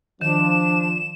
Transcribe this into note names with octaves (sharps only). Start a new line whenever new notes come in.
D#3 F3 D4 E7